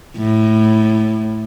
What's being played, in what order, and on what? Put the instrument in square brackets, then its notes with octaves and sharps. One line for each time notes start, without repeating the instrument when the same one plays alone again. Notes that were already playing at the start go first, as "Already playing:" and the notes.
[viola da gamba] A2